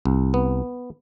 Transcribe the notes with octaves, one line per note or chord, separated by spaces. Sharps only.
C2
B3